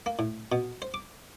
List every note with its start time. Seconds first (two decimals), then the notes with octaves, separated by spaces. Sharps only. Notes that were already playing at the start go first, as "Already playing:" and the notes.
0.06 A#3
0.19 A2
0.52 B2
0.82 C5
0.94 D6